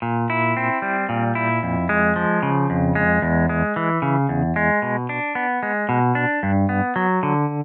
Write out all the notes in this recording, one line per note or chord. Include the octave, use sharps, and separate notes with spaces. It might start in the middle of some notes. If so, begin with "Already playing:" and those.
A#2
E4
C4
G3
A#2
E4
F2
G#3
F3
C#3
F2
G#3
E2
G#3
E3
C#3
E2
G#3
B2
D4
B3
G#3
B2
D4
G2
B3
F#3
D3